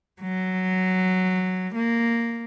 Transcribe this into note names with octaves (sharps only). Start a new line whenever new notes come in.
F#3
A#3